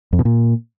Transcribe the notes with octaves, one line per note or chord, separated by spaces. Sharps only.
F2
B2
A#2